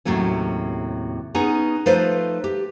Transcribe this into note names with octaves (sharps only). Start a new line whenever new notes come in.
D#2 A2 C3 F#3 A3 C#4
B3 C#4 D#4 G#4
F3 A3 D#4 F4 B4 C5
G4